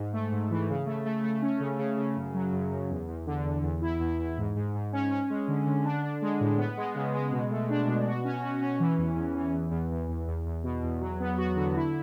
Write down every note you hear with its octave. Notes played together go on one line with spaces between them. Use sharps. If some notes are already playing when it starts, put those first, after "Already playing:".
Already playing: G#2
A3
G#2
E3
C#3
A3
A3
A3
C#4
C#3
C#3
C#3
F#2
F#3
F#2
F#2
E2
E2
D3
E2
E2
E4
E2
E2
G#2
G#2
G#2
C#4
C#4
G#3
D3
D3
D4
D4
G#3
A2
B3
G#3
C#3
G#3
B2
A3
D4
B2
F#4
C#4
F#4
C#4
E3
E2
E2
E3
E2
E2
E2
E2
E2
E2
B2
E2
F#3
B3
F#4
D3
E4